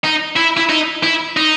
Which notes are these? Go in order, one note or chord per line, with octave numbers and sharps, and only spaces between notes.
D#4
E4
E4
D#4
E4
D#4